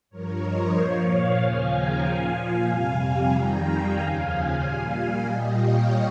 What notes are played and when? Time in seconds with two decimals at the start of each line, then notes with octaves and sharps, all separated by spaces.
0.10 G2 F3 A#4 C#5
0.42 C5 D#5
0.75 A#2 F3 C#5 F5
1.39 D#2 C#3 F3 F5 G#5
1.70 G5 A#5
2.03 A#2 F3 F5 G#5
2.35 F5 G#5
2.67 F2 C3 G3
3.32 F2 D#3 G3 G5 A#5
3.64 F5 G#5
3.96 D#2 C#3 F3 F5 G#5
4.59 A#2 G3 F5 G#5
5.24 A#2 G3 D#5 G5
5.56 C#5 F5